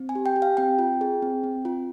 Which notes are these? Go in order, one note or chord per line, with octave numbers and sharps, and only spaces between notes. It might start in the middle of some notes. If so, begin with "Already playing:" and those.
Already playing: C4
G#5
G4
G5
G4
F5
C4 G5
F4
G#4
C4
C4
F4